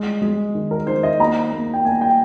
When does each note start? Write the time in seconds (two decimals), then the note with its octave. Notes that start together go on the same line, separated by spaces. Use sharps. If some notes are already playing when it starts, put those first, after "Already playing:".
Already playing: G#3
0.22 G#3
0.55 D#3
0.71 A#4
0.87 D#3 C5
1.03 D#5
1.20 A#3 A#5
1.53 A#3
1.74 G5
1.84 A#3 G#5
2.01 G5